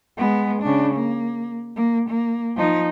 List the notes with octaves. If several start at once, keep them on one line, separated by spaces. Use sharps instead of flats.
G#3 B3
C#3 D4
A#3
A#3
A#3
F3 D#4